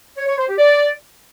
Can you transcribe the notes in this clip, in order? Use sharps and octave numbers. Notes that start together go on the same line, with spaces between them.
C#5
C#5
C5
G4
D5